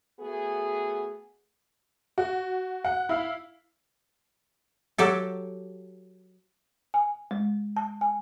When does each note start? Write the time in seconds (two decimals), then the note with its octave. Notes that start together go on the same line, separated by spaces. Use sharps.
0.20 A3 B3 F#4 G#4
2.18 F#4
2.85 F#5
3.09 E4 F5
4.98 F#3 G4 A4
6.94 G#5
7.31 G#3
7.77 A5
8.01 G#5